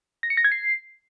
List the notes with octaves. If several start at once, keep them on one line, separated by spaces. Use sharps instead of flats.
A#6
C#7
A#6
G#6
C7